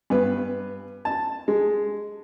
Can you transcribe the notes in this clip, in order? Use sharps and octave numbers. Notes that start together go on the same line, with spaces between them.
G2 B3 B4
A5
G#3